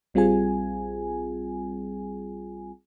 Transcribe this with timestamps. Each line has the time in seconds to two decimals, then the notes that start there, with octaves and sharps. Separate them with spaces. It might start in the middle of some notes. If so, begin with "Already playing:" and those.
0.14 A#1 G3 C4 F4 G#4 G#5